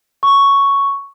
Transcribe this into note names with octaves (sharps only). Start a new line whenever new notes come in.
C#6